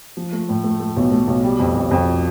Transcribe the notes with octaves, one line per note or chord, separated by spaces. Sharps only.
F3
A3
A2
A3
A3
B1
A3
B1
G3
F2
F2
F2